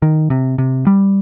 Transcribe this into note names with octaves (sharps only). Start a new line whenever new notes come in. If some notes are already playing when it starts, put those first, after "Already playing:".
D#3
C3
C3
G3